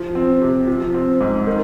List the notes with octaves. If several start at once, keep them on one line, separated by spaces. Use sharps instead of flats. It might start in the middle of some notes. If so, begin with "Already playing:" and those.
Already playing: F3
C4
C3
F3
C4
G#2
D#3